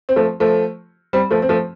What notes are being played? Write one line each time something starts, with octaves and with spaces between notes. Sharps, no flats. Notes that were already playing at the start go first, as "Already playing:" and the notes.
C4
F3 A3
F3 A3
G3 C4
F3 A3
C4
F3 A3